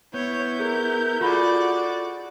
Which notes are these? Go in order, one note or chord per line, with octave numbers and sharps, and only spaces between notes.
B3 E4 C#5 G6
G#4 A#4
F4 F#4 G#4 A4 D5 B5